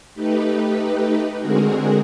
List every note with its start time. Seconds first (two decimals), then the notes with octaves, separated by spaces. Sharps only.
0.15 A3 D#4 G4 B4
1.38 D3 G#3 C4 F#4 G#4 A#4